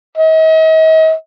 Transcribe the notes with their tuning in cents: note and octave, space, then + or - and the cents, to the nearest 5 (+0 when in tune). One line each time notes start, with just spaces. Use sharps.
D#5 +40